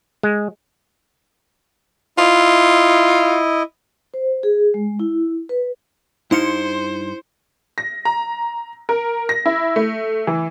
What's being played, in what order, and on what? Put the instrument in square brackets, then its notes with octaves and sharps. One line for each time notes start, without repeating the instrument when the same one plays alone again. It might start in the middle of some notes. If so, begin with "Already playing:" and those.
[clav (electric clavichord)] G#3
[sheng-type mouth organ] E4 D#5 [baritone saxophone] F4
[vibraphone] C5
G#4
G#3
E4
B4
[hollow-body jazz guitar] G2 D#4 F5 [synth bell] E4 C6 C#7 [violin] C5
[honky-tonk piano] A#6
A#5
A#4
A#6
E4
A3
E3